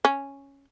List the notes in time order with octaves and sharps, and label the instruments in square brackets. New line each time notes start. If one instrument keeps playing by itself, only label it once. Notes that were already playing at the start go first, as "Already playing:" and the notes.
[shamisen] C#4